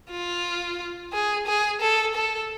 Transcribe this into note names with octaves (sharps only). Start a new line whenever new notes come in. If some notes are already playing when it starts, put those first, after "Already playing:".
F4
G#4
G#4
A4
A4